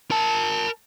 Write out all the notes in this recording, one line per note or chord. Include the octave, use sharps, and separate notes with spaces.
A#4 A5